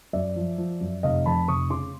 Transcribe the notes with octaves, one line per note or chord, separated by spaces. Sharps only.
F#2 D5 E5
F3
F3
F#2
F1 D#5 F5
F2 A5 B5
F1 C#6 D#6
C#3 C6 D6